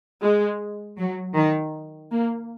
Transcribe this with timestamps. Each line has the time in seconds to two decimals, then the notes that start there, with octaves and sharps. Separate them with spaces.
0.21 G#3
0.98 F#3
1.35 D#3
2.12 A#3